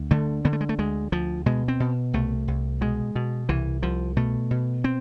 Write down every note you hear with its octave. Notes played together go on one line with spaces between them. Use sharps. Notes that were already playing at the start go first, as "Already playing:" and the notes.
Already playing: D2
D3 A3
D3 B3
A3
G#3
A3
D2 G#3
D2 F3
B2 G#3
C4
B2
C2 A3
C2
B2 G#3
B2
C2 E3
C2 F3
B2 A3
B2
C4